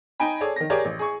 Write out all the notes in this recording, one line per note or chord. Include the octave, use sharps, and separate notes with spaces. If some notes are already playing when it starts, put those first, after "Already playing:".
D#4 G5 G#5 B5
G#4 A4 C#5 D5
D#3 A#6
G4 G#4 A#4 C#5 D5
A1
G#4 C#6